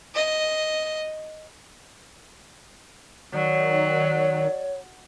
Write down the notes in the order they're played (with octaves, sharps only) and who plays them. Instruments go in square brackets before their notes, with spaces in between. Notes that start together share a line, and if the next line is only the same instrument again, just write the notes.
[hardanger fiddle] D#5
[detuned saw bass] D#3 [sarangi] F#3 [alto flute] C#5 [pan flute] D5